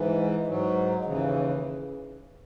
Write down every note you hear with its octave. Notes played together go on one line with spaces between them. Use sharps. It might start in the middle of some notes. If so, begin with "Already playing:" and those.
Already playing: G#2 E3
G#2 F#3
D#2 C#3 E3